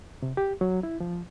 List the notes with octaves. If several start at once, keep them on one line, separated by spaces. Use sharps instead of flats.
C3
G4
F#3
E4
F3